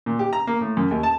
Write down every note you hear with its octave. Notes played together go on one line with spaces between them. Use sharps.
A#2
G4
A#5
A#3
A2
F#2
D#2
A5